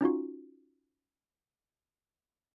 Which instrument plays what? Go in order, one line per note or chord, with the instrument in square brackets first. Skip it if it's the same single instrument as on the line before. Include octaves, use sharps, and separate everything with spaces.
[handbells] C#4 D#4 F4 F#4